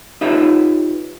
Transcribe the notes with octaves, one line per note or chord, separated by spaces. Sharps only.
D#4 F4 G4 B4 C#5 E5